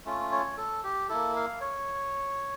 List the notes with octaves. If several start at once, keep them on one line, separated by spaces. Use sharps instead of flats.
A3 C#4 F4
C#5
A4
G4
A#3 E4 A4
F5
C#5